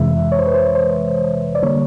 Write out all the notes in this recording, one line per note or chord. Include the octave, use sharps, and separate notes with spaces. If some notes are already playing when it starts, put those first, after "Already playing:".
Already playing: F2 C3 E3 G#3 E5
C#5
C5
B4
C5
C5
D5
D3 G3 A#3 C#5